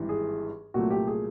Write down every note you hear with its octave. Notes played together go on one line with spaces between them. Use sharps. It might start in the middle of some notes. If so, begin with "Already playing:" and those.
Already playing: G#1 G2 E3
G#4
C2 A#2 F#3 A3 F#4
G4
G#4